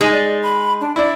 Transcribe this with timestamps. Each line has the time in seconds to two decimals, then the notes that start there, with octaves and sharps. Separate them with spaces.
0.01 G#3 D#4 G#5
0.13 D5
0.43 B5
0.81 D4
0.96 D4 E4 D5